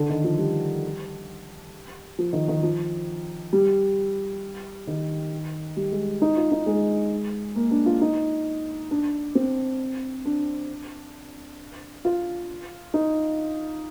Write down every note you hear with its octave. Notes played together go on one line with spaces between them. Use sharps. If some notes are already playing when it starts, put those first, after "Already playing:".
Already playing: D3
D#3
F3
G3
F3
D#3
D#3
F3
G3
D#3
G3
G#3
D#4
F4
D#4
G#3
A#3
D4
F4
D#4
D4
C4
D4
F4
D#4